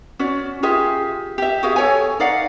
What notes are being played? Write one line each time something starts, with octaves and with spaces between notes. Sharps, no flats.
C#4 F#4 D5
F4 G4 G#4 E5
G4 E5
F#4 G#4 F5
A4 C#5 G#5
D#4 D5 F5 F#5